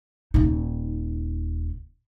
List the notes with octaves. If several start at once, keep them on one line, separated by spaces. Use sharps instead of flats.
D#1 D#4